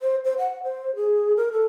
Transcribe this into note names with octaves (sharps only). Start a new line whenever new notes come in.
C5
C5
F#5
C5
G#4
A#4
A4